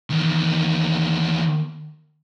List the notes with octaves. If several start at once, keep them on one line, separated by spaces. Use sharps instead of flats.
E2 D#3